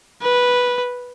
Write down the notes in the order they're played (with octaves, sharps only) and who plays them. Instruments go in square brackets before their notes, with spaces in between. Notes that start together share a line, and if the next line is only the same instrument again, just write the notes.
[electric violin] B4